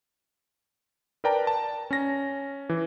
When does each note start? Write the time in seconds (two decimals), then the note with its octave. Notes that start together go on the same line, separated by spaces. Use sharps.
1.24 A#4 B4 D5 G5 A5 A#5
1.47 A5
1.91 C#4 A#6
2.69 E3